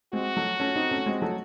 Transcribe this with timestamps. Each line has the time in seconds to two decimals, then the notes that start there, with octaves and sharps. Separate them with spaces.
0.13 G#3 C4 F#4
0.37 F#3 A3
0.60 A3 C#4
0.75 C4 D#4
0.91 A3 C#4
1.06 G#3 C4
1.22 F#3 A3